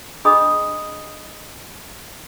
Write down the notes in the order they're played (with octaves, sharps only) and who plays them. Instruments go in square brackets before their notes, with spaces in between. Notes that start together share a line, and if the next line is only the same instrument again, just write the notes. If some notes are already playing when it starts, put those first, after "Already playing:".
[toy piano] D4 G#4 D#5 B5 D#6